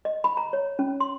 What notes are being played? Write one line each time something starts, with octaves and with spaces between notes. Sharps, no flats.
D#5
B5
A#5
C#5
C#4
C6